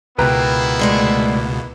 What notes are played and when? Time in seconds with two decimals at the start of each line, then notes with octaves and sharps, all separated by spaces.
0.18 C#2 B2 A#3 B3 E4 B4 G5 A#5
0.79 D2 G#3 A3